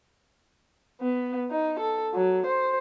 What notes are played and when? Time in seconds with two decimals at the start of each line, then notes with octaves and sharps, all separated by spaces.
1.01 B3
1.51 D#4
1.80 A4
2.14 F#3
2.47 C5